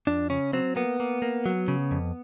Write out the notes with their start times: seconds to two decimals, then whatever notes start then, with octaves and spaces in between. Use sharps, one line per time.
0.07 F2 D4
0.30 C#3 C#4
0.53 F#3 C4
0.76 A#3 B3
1.00 A#3
1.22 A#3
1.46 F#3
1.68 C#3
1.91 F2